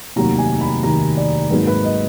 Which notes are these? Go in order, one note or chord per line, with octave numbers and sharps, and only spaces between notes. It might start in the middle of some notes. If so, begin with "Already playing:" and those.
F1 D#2 D#3 F#3 A#3 A#5
G#5
B5
F1 D#2 D#3 F#3 A#3 A#5
D5
G#1 G#2 F#3 A#3 B4
B4
D#5